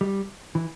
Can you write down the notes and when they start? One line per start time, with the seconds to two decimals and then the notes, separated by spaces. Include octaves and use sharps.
0.01 G3
0.55 E3